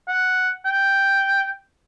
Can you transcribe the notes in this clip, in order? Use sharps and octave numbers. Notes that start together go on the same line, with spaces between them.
F#5
G5